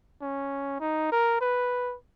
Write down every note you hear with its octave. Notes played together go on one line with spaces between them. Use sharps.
C#4
D#4
A#4
B4